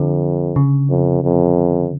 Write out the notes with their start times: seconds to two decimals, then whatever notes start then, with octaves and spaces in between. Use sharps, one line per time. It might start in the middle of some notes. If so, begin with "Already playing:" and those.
Already playing: F2 D3
0.56 C#3
0.90 F2
1.24 F2